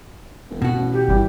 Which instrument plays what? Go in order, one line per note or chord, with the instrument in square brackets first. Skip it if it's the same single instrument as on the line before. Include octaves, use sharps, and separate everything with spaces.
[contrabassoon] E1
[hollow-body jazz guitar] B2 F#4
[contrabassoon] A1
[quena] G4
[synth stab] G#1 G3 [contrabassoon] E3